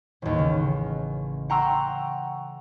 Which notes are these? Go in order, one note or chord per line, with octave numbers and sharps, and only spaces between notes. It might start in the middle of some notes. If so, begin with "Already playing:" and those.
A1 D#2
C#3
F#5 G5 A#5 C6 C#6 E6